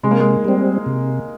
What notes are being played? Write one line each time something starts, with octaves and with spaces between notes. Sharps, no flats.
C3 G#3
A#3
G#3
G3 C4
C3